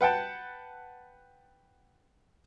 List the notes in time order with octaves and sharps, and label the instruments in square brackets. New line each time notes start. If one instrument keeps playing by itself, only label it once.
[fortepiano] B4 F#5 G5 A5